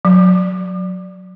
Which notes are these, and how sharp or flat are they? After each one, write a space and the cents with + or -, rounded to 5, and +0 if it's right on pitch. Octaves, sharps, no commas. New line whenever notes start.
F#3 -20